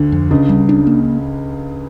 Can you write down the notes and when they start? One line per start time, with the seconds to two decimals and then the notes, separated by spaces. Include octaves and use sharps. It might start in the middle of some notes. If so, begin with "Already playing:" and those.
Already playing: D2 D3
0.12 F2
0.31 C#2 C#3 D4
0.49 G3
0.69 D4
0.87 A#3